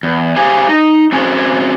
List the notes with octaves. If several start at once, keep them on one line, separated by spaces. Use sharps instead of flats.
E2
G4 G#4 C5 C#5 F5 G#5
D#4
C4 C#4 F#4 G#4 C5 C#5